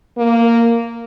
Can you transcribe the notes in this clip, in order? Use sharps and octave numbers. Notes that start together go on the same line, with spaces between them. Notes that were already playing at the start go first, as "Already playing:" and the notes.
A#3